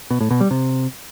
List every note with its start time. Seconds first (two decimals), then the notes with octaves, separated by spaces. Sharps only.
0.11 B2
0.21 A2
0.31 B2
0.41 G3
0.51 C3